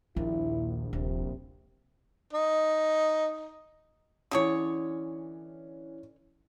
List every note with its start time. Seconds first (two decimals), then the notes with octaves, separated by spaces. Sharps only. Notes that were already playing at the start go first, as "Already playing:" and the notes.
0.16 A#1 D#2 E4
0.93 D#1 C3
2.33 D#4
4.31 D3 E3 C#4 G#4 C#5